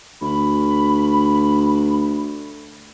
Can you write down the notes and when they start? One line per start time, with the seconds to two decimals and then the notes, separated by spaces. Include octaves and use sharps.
0.21 D2 B5